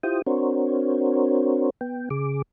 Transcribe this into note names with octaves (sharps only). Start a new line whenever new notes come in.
E4 F4 G4 C5 G5 D#6
C4 D4 F#4 A#4 C5 C#5
B3 G5
C#3 G#4 D6